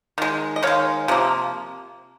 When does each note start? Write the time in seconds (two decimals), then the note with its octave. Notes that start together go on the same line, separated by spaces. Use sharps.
0.18 D#3 G#3
0.56 D#5
0.63 D#3 G#3 C#5 F5
1.08 C3 F3 A#3